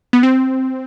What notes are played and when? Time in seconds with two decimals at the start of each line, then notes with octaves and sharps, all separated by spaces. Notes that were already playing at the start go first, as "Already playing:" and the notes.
0.13 B3
0.23 C4